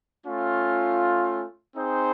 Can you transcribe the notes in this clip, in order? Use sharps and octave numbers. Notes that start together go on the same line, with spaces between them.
A3 C#4 F4
C4 D#4 G#4 C5